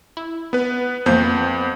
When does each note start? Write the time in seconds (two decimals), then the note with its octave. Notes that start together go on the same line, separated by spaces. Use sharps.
0.17 E4
0.53 B3 B4
1.06 F2 F3 A#3 B3 C5 G6